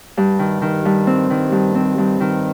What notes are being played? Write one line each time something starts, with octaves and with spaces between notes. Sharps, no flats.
G2
D#3
D#3
G2
C4
D#3
G2
C4
G2
D#3